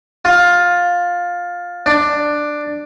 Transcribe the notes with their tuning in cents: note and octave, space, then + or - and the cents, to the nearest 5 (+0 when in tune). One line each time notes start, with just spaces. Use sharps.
F4 +15
D4 +10